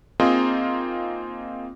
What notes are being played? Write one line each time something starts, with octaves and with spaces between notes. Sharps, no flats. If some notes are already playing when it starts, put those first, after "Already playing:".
A#3 C4 D#4 F4 G#4